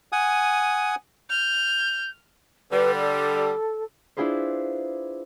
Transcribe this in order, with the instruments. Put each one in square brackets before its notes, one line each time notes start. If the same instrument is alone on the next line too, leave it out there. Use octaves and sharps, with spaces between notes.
[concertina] F#5 G#5 D#6
[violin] F6 [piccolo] G6
[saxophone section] D3 G3 [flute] B4
[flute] A4
[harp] D4 E4 F4 G#4 B4 C5